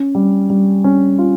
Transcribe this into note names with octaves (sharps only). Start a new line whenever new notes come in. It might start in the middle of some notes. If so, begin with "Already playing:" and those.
Already playing: C#4
G3
G3
C#4
F4